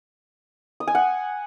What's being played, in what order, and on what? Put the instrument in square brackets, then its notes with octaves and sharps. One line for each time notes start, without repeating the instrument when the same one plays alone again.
[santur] D#6
G#5
F#5